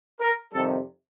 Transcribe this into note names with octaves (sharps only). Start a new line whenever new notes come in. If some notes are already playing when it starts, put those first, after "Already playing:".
A#4
F2 C3 D#3 G3 A4